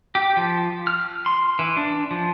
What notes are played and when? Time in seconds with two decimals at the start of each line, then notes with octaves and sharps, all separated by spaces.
0.15 G4
0.37 F3
0.87 F6
1.26 C6
1.59 E3
1.77 D4
2.11 F3